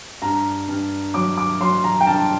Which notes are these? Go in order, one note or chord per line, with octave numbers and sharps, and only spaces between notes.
G2 A#5
G2
F#3 D6
D6
F#3 C6
A#5
G5
G2 A5